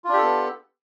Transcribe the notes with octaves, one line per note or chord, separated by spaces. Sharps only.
B3 D4 F4 G4 A4